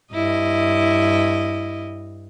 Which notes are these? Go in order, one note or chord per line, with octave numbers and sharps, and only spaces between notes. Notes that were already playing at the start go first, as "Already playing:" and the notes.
G2 E4 D#5